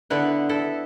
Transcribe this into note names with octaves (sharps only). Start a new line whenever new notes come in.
D3 B3 E4 B4
E4 A4